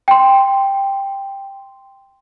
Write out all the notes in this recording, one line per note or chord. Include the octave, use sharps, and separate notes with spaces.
G5 C6